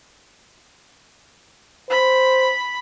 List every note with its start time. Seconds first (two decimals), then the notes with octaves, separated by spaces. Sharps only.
1.90 C5 B5